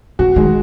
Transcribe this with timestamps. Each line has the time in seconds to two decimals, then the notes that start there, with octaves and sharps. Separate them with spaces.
0.19 C#3 F#4
0.36 D#3 G#3